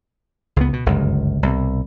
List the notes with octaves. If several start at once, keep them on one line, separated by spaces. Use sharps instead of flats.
C#2 B3
B2
G1 C#2 F#2
C2 B2